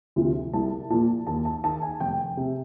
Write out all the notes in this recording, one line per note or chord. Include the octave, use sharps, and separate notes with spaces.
D2 C3 F3
C2 A5
A#2 F3 A5
D#2 A5
A5
D#3 A5
G#5
F1 G5
C3